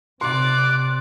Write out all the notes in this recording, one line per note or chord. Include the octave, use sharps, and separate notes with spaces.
C3 D5 C6 D6 F#6